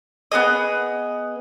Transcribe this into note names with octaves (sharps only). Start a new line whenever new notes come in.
B3 D4 G#4 D#5